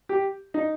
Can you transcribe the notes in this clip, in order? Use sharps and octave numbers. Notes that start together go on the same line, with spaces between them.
G4
D#4